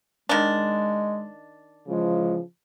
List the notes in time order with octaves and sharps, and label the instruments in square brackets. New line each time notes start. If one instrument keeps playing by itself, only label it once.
[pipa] D#3 D4 [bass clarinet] G#3
[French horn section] C#3 E3 F3 [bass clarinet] G#3